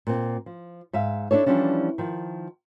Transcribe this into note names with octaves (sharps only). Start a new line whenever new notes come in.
A#2 C4
F3
G#2 E5 F5
D4 E4 A4 C#5
E3 F3 G3 C#4 D4
D#3 F3